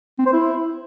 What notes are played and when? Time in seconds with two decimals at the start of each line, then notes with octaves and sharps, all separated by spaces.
0.19 C4
0.26 C5
0.33 E4